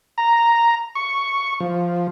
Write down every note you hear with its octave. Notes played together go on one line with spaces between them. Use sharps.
A#5
C#6
F3